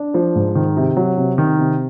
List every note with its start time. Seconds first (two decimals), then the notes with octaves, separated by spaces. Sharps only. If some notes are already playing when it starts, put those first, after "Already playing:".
Already playing: D4
0.14 F3
0.35 G#2
0.55 D#3
0.77 C3
0.97 F#3
1.17 C3
1.38 D#3
1.59 C3